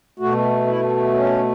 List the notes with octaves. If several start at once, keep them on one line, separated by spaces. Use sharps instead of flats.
B2 A3 F#4
E4
C#4